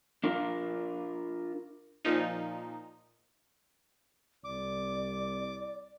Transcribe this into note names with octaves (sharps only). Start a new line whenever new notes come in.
D4 F4 A#4
A#2 F3 D#4
C2 D5 D6